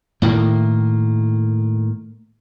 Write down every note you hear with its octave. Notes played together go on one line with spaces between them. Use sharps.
A2 D#3 A#3